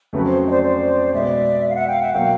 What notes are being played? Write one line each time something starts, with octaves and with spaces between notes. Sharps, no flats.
F2 C#3 F#3 A3 C#4 B4
C5
D#5
C5 D5
C5 D5
B2 G#3 B3 D5 E5
F5
E5 F#5
F5 G5
E5 F#5
B2 F#3 A#3 F5 G5